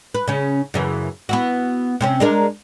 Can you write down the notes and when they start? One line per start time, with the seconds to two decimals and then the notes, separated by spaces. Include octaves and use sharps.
0.14 B4
0.28 C#3 C#4
0.74 F#2 C#3 E3
1.29 B3 E4 F#4
2.01 C3 C4 C#4
2.20 G#3 D4 A#4